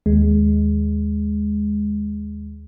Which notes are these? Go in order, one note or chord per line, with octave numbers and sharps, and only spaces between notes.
D#2 G#3